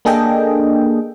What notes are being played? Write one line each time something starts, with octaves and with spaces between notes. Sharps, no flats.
A#3 D4 G#4 A4 D#5 G5